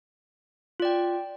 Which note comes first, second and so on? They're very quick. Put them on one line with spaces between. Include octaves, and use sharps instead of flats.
F4 D5 G5